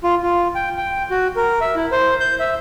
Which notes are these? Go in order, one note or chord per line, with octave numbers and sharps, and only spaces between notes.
F4
F4
G5
G5
F#4
A#4
E5
E4
C5
G6
E5